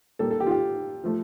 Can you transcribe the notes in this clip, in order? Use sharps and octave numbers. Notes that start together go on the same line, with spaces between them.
A#2 G3 A#3 A4
A4
G4
F4
G4
F3 A3